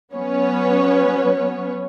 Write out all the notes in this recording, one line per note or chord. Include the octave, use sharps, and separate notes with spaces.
F#3 B3 C#4 B4 C#5